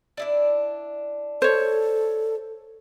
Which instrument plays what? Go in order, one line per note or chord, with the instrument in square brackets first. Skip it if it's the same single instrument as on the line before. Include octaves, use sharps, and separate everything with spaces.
[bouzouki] D4 E4 D5
[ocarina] A4 [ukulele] C5 C#5